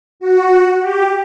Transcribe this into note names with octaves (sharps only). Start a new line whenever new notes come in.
F#4
G4